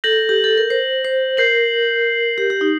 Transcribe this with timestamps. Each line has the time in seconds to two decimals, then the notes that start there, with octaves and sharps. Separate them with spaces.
0.04 A4 G6 A#6 F#7
0.29 G4
0.44 A4
0.58 A#4
0.70 C5
1.05 C5
1.37 A#4 G6 C7 F#7
2.38 G4
2.50 G4
2.61 D#4